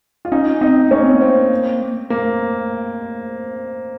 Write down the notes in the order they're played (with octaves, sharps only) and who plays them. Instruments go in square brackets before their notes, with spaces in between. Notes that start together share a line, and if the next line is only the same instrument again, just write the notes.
[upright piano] F4
[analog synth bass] C#4 [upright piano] D#4
[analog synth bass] C4 [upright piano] D#4
[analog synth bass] A#3 [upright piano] C#4
[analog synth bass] C4
A#3
[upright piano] C4
A#3